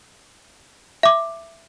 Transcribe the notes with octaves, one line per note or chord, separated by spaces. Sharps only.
E5 D6